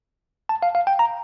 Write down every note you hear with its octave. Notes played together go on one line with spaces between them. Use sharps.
A5
F5
F5
G5
A#5